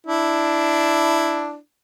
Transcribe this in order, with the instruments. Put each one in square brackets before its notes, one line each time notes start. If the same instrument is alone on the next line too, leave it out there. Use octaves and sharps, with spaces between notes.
[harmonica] D4 E4